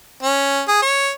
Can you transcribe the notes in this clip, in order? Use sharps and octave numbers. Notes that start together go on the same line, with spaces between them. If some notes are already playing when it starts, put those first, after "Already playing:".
C#4
G#4
C#5